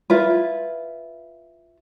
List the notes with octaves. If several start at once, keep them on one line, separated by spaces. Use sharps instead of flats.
E4 F4 B4